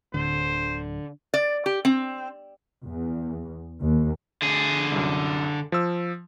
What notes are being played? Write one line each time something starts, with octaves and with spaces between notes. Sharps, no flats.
D1 D3 C5
D5
G4
C4
E2
D#2
D3 G#4
C2 F#2
F3 E6